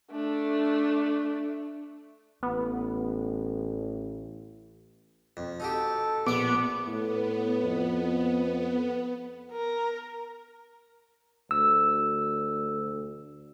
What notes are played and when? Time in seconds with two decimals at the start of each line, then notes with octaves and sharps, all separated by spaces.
0.12 A3 D4
2.43 A1 B3
5.37 F2
5.60 D#4 F#4 G4 A4
6.27 A#1 B3 F#5 D6
6.87 A2 B3
7.64 F2
9.52 A#4
11.51 D2 E6